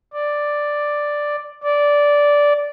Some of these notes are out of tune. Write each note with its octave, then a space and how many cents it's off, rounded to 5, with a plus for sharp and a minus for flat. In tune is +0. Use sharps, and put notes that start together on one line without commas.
D5 +5
D5 -10